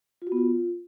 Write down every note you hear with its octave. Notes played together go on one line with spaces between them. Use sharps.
F4
F#4
B3
F4